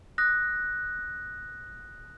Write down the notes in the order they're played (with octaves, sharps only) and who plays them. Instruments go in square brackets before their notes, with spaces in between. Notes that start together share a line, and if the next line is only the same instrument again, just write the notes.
[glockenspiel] D#6 F#6 A#6